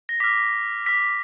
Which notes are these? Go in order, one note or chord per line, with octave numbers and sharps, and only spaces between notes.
A#6
D6 F6 B6
D6 F6 B6